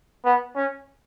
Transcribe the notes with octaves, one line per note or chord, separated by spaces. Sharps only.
B3
C#4